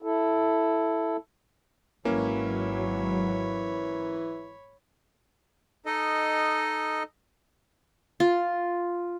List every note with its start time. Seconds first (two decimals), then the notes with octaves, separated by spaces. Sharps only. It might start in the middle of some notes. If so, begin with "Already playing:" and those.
0.02 E4 A4
2.05 G#1 E3 F#3 A#3 C#4 C#5 B5
5.86 D#4 A4 D#5
8.20 F4